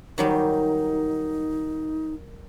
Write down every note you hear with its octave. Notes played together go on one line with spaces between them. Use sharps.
D#3 F#3 G3 D#4